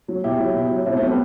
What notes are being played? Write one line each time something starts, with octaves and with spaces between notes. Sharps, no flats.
F#3
B2 E4 G4
F#3
B2
F#3
B2 C4 E4
A3 C4
F#3
G3 B3